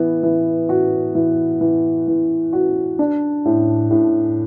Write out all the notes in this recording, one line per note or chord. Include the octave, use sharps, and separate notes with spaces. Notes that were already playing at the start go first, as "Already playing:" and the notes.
Already playing: E3 B3
E3
F#4
E3
E3
E3
F#4
D4
A2
A2